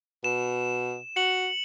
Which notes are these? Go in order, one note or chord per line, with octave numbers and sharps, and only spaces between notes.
B2 E7
F#4 C#7 F#7